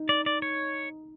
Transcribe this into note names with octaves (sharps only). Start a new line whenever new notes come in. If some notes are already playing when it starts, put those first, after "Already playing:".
Already playing: D#4
D5
D5
C#5